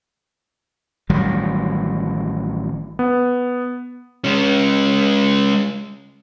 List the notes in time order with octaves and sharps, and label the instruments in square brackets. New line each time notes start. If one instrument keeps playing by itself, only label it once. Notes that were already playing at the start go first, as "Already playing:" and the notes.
[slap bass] A1 D#3 F#3 G3
[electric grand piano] B3
[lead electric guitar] G#3 C#4